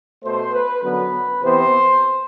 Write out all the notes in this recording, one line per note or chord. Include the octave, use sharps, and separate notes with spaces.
B2 A3 C5
B4
F#2 D3 F#3 B3 B4
C3 E3 B3 C5